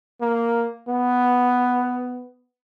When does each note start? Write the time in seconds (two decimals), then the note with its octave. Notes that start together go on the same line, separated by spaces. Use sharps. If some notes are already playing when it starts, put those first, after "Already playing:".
0.21 A#3
0.88 B3